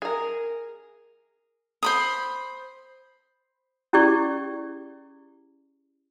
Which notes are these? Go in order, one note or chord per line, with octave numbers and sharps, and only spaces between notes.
G#4 A#4
C5 B5 D#6
C#4 E4 G4 G#4 D5 C#6